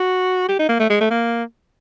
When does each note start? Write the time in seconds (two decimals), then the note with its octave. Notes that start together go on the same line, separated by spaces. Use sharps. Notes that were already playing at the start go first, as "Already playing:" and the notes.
Already playing: F#4
0.49 G4
0.59 D#4
0.69 A#3
0.80 A3
0.90 G#3
1.01 A3
1.11 A#3